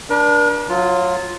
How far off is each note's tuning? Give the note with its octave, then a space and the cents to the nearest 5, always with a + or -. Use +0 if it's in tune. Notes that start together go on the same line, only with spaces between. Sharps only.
D4 +0 A#4 +45
F#3 -25 F4 +0